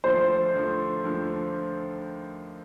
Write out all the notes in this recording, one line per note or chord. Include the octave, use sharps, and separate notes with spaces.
D#2 D3 F3 A3 C5
D#2 D3 F3 A3
D#2 D3 F3 A3